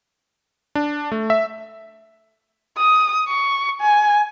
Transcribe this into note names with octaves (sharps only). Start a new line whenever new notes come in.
D4
A3
E5
D#6
C#6
G#5